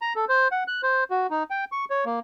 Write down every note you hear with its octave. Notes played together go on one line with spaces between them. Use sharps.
A#5
A4
C5
F#5
F#6
C5
F#4
D#4
G5
C#6
C#5
A#3